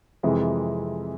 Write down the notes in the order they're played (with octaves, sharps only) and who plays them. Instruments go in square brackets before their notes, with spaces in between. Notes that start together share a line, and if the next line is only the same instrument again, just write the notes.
[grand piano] F2 C3 E3 G#3